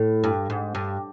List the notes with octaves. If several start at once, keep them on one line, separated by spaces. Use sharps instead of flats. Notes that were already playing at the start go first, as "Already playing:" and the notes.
Already playing: A2
G2
G#2
G2